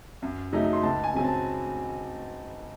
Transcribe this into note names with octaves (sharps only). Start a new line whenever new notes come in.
F#2
C#3 F#3 A3 D#4
C6
C#2 A5
G#5
C#3 F#3 C4 G#5
A5